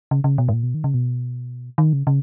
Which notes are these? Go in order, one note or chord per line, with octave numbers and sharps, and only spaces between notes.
C#3
C#3
B2
G#2
A#2
B2
D#3
C#3
B2
D#3
C#3
C#3